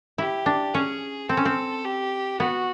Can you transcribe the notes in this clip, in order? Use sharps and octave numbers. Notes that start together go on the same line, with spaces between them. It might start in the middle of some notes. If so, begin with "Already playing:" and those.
E4 G4
D4
C#4 G#4
C4 A4
C#4
C4
G4
B3 F#4